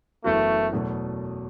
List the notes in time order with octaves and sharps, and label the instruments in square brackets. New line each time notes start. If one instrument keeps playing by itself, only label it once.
[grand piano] F#1 F#2 E3 B3 F#4 [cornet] A3
[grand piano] E2 B2 F#3 A3